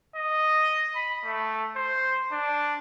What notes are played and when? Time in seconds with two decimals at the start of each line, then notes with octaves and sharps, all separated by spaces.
0.15 D#5
0.95 B5
1.25 A3
1.76 C5
2.32 D4